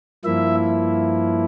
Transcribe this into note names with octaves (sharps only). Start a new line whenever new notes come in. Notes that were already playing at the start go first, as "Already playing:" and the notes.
G2 F3 A#3 E4 E5